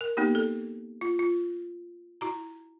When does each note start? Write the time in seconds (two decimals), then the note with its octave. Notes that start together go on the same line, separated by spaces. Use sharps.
0.01 A#4
0.17 A#3 B3 D#4 G4
0.35 A4
1.01 F4
1.19 F4
2.21 E4 F#4 A#5